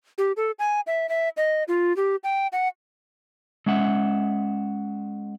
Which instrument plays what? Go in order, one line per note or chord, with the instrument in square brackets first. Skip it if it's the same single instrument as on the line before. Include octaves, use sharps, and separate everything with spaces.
[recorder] G4
A4
G#5
E5
E5
D#5
F4
G4
G5
F#5
[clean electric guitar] G#3 C#4 E5 F#5